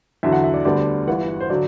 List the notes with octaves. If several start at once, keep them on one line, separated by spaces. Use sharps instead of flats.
E2 D3 F#3 E5
F#5
E5
D5
D2 D3 G3 B3 D5
G1 G2 E3 F#5
C5
D3 F#3 D5